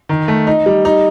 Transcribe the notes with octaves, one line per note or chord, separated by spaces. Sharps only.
D#3
A3
D#4
G3
D#4